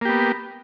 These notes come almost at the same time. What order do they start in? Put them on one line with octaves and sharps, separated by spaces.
A#3 G4 B3